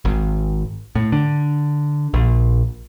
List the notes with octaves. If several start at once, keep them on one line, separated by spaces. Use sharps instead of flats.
G#1
A2
D3
A#1